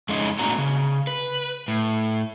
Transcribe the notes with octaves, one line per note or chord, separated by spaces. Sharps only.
F2 G#3 C#4 D#4
A2 B3 D4 F#4 A#5
C#3
B4
A2